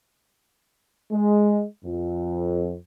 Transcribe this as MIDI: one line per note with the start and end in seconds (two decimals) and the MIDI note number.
1.12 1.64 56
1.85 2.76 41